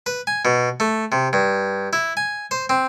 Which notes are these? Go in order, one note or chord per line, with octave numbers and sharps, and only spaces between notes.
B4
G#5
B2
A3
C3
G2
E4
G#5
C5
C4